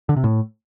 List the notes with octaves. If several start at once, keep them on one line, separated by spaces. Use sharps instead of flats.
D3
C3
A2